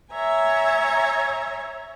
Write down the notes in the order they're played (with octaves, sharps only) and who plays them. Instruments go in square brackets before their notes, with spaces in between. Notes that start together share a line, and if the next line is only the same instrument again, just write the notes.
[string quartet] C#5 E5 G#5 A#5